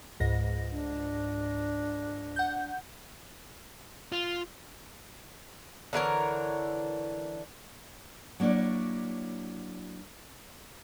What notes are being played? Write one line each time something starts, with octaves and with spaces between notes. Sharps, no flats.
C#2 G#2 A#6
D4
F#5 G6
F4
D3 E3 A#4 C#5
F#3 A#3 D4 E4 C#5